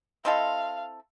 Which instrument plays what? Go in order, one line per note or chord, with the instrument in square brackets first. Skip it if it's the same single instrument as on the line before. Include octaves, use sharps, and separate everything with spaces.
[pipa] C4 E4 A4 [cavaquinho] D#5 C6 D#6 [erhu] F5